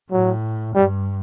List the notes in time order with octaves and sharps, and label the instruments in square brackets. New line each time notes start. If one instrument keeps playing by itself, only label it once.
[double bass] A2 [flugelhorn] F#3
[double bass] G2 [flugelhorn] G3